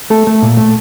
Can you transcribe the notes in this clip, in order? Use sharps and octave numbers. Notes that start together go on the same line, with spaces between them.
A3 A4
A3
A#2
A3